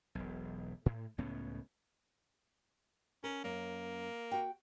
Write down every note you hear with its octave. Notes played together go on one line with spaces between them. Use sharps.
E1 B1
A2
C#2 A2 B3 C#4
C#4 A#4
F#2 A#3 C#4
F#4 G5